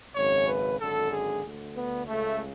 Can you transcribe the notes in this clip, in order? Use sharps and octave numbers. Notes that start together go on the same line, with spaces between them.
G#1 F#2 C#3 C#5
B4
G#1 F#2 D3 A4
G#4
D2 D3
B3
C#2 C#3 A3